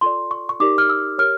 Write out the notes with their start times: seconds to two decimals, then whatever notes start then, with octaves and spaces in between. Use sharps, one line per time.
0.01 F4 A4 D5 C6
0.31 C#6
0.49 C#6
0.60 D#4 G4 A#4 D5 D6
0.78 F6
0.89 E6
1.18 G4 A#4 C#5 F6